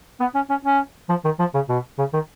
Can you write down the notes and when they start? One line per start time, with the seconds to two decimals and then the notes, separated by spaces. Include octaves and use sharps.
0.20 B3
0.35 C#4
0.50 C#4
0.65 C#4
1.09 F3
1.25 D#3
1.39 F3
1.54 C#3
1.69 B2
1.99 C#3
2.14 D#3